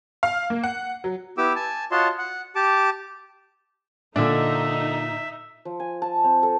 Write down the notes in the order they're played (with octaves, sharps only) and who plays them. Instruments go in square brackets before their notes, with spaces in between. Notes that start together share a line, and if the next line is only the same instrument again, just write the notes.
[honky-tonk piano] F5
A#3
F#5
F#3
[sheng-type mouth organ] B3 E4 G4 D6 E6
G#5 A5
F4 F#4 C#5 D#5 A5 C6
F#5
G4 A5 D6
[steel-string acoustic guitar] A#2 [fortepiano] D3 D4 [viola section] D#4 [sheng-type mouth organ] E5
[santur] F3
G#5
A5
C4
A4